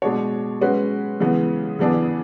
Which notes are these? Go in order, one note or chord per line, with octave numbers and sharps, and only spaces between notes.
B2 G#3 D4 F#4 C#5
G#3 C#4 F#4 B4
C#3 E3 G#3 B3
C#3 E3 B3 D4 G#4